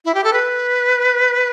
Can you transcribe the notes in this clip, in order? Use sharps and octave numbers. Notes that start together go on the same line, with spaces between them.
E4
G4
A4
B4